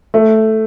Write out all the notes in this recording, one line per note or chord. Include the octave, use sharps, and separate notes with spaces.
A3